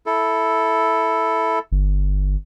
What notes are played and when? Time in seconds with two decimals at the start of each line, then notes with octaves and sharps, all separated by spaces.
0.06 E4 A4
1.72 G1